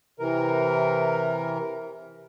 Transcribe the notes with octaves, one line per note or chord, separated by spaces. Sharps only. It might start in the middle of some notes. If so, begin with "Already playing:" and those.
C3 E3 A#4